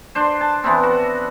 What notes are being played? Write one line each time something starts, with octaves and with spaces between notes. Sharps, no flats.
D4 C5
A5
E3 B3 C4
F#4